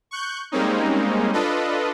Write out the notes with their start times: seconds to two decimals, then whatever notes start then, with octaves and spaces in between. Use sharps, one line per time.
0.11 C#6 F#6 G6
0.52 G3 G#3 A#3 C4 C#4 D#4
1.33 D4 F4 A4 B4 D#5